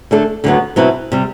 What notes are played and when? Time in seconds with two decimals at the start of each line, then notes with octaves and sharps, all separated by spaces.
0.11 D3 A3 D4 A4
0.44 D2 D3 F#3 B3
0.76 B2 F#3 C4 E4 B4
1.12 C3 G3